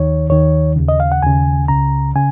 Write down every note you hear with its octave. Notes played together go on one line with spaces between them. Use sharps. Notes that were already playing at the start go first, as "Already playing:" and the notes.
Already playing: D#2 D#3 C#5
D#2 D#3 C#5
D#2 C#3
D#5
F5
F#5
D#2 C#3 G#5
C#2 C#3 A#5
C#3 G#5